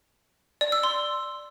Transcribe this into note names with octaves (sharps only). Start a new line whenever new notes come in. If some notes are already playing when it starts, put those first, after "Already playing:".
D5
E6
C6